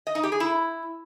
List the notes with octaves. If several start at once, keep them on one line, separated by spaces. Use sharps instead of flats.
D#5
D#4
G4
G#4
E4